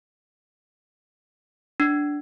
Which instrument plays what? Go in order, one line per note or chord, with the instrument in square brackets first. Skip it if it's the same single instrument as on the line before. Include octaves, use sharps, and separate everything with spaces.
[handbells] D4